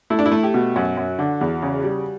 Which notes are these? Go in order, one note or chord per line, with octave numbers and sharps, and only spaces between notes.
A3 E4
D4
E4
A3
G4
B2
F#2 F#4
F#2
D3
E2
C#3
G3